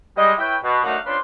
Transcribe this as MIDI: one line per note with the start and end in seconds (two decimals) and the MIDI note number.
0.17 0.32 55
0.17 0.32 56
0.17 0.32 75
0.39 0.56 64
0.39 0.56 71
0.39 0.56 73
0.39 0.56 76
0.39 0.56 79
0.63 0.79 47
0.84 0.97 42
0.84 0.97 57
0.84 0.97 62
0.84 0.97 63
0.84 0.97 77
0.84 0.97 78
1.06 1.18 61
1.06 1.18 62
1.06 1.18 65
1.06 1.18 71
1.06 1.18 72
1.06 1.18 84